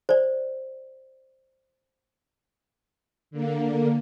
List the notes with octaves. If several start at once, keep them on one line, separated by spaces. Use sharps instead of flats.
C5 D5
D3 A#3